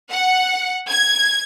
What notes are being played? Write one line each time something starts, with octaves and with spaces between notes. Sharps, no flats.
F#5
G#6